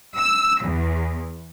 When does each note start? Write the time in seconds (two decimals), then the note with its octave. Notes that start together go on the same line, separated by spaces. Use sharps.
0.18 E6
0.62 E2